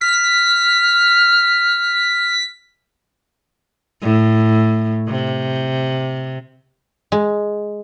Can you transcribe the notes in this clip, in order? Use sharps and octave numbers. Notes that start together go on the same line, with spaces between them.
F6 B6
A2
C3
G#3